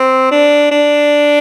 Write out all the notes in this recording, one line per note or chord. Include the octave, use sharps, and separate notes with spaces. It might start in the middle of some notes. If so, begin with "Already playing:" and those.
Already playing: C4
D4
D4